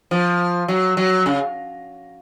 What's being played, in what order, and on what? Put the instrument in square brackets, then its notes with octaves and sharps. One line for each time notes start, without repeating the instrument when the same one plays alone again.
[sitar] F3
F#3
F#3
C#3